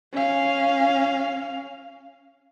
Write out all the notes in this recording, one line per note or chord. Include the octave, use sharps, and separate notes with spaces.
C#4 F5